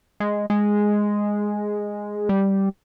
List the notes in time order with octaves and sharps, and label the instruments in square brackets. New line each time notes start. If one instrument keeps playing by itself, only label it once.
[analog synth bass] G#3
G#3
G3